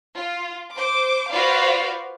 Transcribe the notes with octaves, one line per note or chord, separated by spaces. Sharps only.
F4
C5 D6
F4 F#4 B4 C5 D5 F5